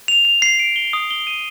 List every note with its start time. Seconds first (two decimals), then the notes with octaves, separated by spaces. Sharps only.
0.08 F7
0.25 F7
0.42 C7
0.59 D7
0.76 G7
0.93 D#6
1.11 G7
1.27 D#7